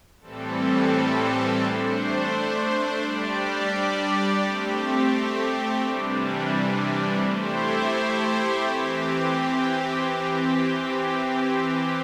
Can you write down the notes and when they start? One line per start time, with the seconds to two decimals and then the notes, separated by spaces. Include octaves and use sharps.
0.21 A2 E3 G3 C4 A4
1.61 A3 D4 C5
3.00 G3 D4 G4 D5
4.40 A3 C4 G4
5.80 C3 E3 G3 D4
7.20 A3 E4 G4 C5
8.59 E3 C4 G4